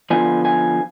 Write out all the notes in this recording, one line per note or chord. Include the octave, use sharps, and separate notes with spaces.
D3 F3 B3 F4 G#5
G#5